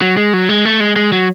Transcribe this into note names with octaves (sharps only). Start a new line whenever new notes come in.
F#3
G#3
F#3
G#3
A3
G#3
G#3
F#3